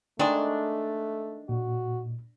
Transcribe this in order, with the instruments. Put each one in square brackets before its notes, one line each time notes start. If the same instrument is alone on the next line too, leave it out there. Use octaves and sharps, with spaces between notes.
[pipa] D#3 G#3 [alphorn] A3 [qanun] D4
[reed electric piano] A#2 [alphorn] F#4